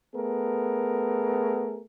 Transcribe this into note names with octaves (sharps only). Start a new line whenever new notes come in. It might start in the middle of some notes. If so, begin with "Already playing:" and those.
A3 B3 G#4 A#4